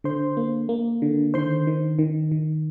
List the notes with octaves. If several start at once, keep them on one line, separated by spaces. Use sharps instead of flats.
D3 C5 C6
A#3
A#3
D3
D#3 C5 C6
D#3
D#3
D#3